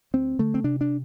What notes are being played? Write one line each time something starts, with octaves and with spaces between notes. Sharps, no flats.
D2 C4
D3 A3
C4
C3 D4
D4